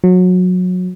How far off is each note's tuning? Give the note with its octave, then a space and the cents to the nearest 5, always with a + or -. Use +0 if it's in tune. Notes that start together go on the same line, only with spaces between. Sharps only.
F#3 -25